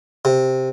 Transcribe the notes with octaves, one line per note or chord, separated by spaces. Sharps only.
C3